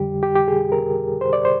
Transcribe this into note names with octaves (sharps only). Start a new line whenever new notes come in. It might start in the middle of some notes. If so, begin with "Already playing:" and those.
Already playing: F2 D3 G3 G4
G4
G4
G#4
A#4
C5
D5
C5